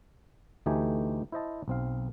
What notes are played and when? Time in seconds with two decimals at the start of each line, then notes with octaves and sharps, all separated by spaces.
0.66 D2 E3 A3 D#4 G4 G#5
1.32 E4 C5 D#5 A5
1.68 B1 C4 F5